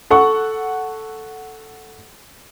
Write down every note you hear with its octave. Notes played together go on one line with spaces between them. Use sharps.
A4 F#5 C#6